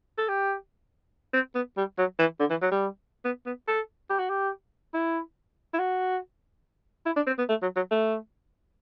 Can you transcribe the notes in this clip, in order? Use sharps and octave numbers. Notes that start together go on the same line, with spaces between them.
A4
G4
C4
B3
G3
F#3
E3
D3
E3
F#3
G3
B3
B3
A4
G4
F#4
G4
E4
E4
F#4
E4
D4
C4
B3
A3
F#3
F#3
A3